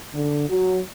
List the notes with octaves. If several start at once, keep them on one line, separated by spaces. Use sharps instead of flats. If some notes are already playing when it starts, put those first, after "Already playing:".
D3
F#3